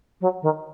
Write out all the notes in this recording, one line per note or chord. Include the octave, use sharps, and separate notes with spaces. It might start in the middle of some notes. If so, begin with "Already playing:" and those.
F#3
D#3